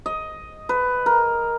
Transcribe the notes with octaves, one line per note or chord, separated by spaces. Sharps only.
D#5
B4
A#4